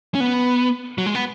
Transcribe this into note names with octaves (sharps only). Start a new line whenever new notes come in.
C#4
B3
F#3
G#3
B3